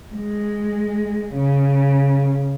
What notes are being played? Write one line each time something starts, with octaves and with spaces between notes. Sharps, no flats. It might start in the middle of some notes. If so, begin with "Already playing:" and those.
G#3
C#3